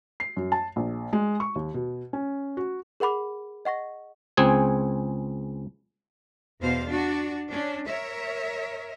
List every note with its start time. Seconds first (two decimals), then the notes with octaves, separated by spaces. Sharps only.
0.20 C7
0.37 F#2
0.52 A5
0.76 A#1
1.13 G#3
1.40 C#6
1.56 D#2
1.74 B2
2.13 C#4
2.57 F#4
3.00 G#4 A#4 F#5 B5 D6
3.65 D#5 F#5 C#6 A#6
4.37 C#2 C4 G#4 G#5
6.61 E2 B2 C5 F5
6.89 D4 F#4
7.50 C#4 D4
7.87 A#4 C#5 E5